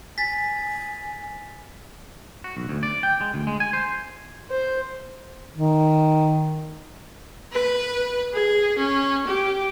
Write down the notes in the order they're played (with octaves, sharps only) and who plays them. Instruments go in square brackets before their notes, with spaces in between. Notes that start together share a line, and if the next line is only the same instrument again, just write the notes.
[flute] G#5 [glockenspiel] A6 B6
[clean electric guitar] F#4
B1
D2
D5
G5
G#3
D2
G#3
G#5
C5
[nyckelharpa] C5
[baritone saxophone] D#3
[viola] B4
G#4
C#4
G4